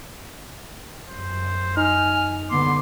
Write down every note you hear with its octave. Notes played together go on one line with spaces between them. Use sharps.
F#2 C5
D#4 G#5 F6
D3 B3 C6 D6